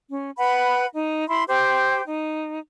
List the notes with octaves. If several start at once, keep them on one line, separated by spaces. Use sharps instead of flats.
C#4
B4 F#5 B5
D#4
E4 B5 C6
G4 C5 G5
D#4